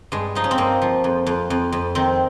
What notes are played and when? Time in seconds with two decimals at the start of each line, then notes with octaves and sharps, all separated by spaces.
0.12 G2 G#3
0.35 F3 D#4
0.44 C#4
0.51 C4
0.58 G2 A#3
0.82 F3
1.04 F2
1.26 F2
1.50 F2
1.72 F2
1.95 D#3 C4